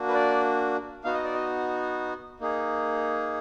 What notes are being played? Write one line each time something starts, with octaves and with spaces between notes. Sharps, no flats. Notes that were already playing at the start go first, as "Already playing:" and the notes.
Already playing: A#3 D4 F#4
B4
D5
B3 D#4 F#4 F5
D#5
D5
D#5
A#3 D#4 G#4